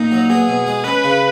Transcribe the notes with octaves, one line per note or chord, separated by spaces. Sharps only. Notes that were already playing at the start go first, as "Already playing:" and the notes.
Already playing: A#2 D#4
F#3
B3 G#4
B2
G#3
C#4 B4
C#3